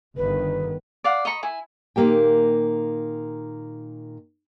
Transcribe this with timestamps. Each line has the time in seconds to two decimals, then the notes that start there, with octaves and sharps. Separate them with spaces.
0.17 G1 D3 D#3 B4
1.04 D5 F5 F#5
1.25 D#5 A#5 B5 C#6
1.43 E4 G#5
1.96 A#2 D#3 E3 A#3 G4 G5